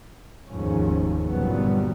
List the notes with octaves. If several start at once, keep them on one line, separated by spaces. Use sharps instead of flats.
F1 D#2 G#2 F3 C#4
G1 D#2 A#2 F#3 G3 B3